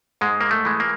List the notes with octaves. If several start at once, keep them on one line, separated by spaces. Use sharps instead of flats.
G#2 G#3
A#3
A3
E3 G#3
A#3